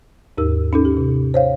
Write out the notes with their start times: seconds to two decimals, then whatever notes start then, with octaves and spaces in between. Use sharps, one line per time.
0.38 D#2 G#2 D#4 G4 A#4 E6
0.73 C#4 D#4 A4
0.85 G4
0.97 C3
1.34 C5 C#5 F5